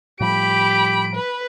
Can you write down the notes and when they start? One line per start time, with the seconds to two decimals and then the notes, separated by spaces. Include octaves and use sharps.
0.20 A2 F3 G3 G4 B5 D7
1.15 B4